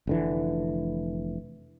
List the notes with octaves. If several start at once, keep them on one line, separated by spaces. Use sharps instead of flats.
F1 D3 E3